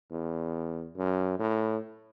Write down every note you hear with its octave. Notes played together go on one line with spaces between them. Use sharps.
E2
F#2
A2